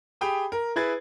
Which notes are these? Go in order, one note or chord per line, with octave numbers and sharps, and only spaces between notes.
G4 G#4 G5 B5 D#6
A#4
E4 G#4 B4 G#6 A6